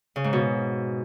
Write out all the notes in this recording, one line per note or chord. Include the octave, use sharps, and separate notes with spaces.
C#3
G#2
B2